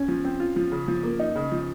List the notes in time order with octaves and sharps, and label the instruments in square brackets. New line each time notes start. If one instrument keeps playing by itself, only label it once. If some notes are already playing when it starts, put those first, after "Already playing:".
Already playing: [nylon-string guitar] C#4
[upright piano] F3
C4
F4
F3
C#3
F3
A#3
D#4
C#3
F3